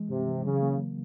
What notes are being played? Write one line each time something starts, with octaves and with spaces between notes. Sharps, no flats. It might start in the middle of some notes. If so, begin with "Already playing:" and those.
Already playing: E3 G#3
G2 C3
E3
C#3 F#3
A#3
C#3